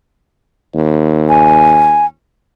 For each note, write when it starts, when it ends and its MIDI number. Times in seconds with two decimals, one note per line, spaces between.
0.75 2.08 39
1.29 2.06 80